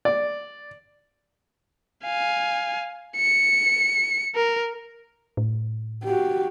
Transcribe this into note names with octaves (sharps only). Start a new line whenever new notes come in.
D5
F5 G#5
C#7
A#4
A2
F#4 G4